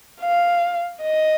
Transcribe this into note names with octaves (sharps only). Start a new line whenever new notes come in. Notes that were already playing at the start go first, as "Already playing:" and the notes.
F5
D#5